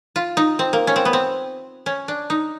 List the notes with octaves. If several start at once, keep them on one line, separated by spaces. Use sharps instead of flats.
F4
D#4
C4
A#3
C#4
C4
B3
C4
C#4
D4
D#4